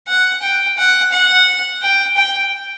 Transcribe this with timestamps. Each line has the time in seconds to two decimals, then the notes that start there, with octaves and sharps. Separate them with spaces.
0.08 F#5
0.42 G5
0.78 F#5
1.12 F#5
1.82 G5
2.16 G5